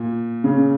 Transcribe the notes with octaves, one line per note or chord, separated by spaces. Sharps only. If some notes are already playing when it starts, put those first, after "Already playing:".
Already playing: A#2
C#3